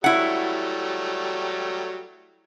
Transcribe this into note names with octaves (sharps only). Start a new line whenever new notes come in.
F#3 G3 A3 E4 F#5